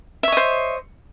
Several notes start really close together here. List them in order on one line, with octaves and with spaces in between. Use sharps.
E5 C#5 D#5 C5